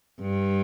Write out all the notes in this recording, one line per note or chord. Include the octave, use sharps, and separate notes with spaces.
G2